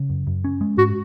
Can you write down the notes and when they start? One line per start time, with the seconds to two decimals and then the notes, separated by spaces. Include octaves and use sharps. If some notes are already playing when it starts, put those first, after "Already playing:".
Already playing: C#3
0.10 F#2
0.27 F#2
0.44 C#4
0.61 G#3
0.78 G#2 F#4